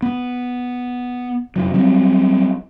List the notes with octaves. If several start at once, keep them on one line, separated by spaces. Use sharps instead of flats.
B3
F1 C#3 F#3
F#3 G3 C4